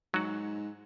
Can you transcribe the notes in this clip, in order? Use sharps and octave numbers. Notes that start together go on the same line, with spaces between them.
G#2 F#3 F#4